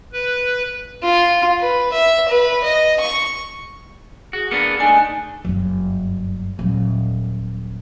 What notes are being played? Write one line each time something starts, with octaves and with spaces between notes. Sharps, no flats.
B4
F4
B4
E5
B4
D#5
C#6
F#4 G#4
A#3 B3 D4 C#7
A3 D4 D#4 G#5
F#1 G2
D#1 F#3